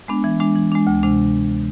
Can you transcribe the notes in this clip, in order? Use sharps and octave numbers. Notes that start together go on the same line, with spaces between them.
G#3 B3 D4
E3
G#3 D4
E3
G#3 D4
D2
C3 G#3 D4